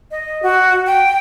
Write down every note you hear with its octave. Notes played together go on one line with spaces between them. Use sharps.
D#5
F#4
G5